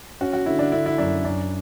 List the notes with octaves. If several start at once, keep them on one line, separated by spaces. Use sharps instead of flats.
C#4 F#4
F#4
D3 E4
D4
D3 E4
E4
F#2 D4
F#2 D4